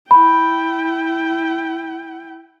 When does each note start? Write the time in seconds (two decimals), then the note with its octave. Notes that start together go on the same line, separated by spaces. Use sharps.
0.11 E4 G5 B5